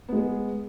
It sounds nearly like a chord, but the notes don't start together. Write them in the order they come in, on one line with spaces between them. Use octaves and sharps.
B3 G#3 G#4